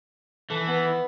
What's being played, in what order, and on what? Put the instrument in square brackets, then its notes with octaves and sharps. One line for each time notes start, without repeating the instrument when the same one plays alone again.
[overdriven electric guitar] E3 [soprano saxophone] A4
[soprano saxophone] B3